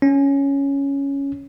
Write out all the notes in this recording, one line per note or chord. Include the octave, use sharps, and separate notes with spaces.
C#4